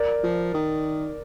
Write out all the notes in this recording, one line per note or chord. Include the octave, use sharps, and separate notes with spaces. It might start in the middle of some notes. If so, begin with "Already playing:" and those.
Already playing: A#4 D5
F3
D#3